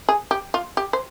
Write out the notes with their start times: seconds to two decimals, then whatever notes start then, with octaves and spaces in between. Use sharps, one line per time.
0.09 G#4
0.31 G4
0.54 F4
0.77 G4
0.93 C5